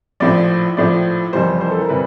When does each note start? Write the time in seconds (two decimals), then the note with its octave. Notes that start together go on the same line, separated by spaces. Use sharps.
0.20 A#1 A2 F3 D5
0.77 A#1 A2 F3 D5
1.33 F#1 F2 C3 E3 G3 C5
1.61 C5
1.71 A4
1.80 A#4
1.89 C3 E3 G3 B4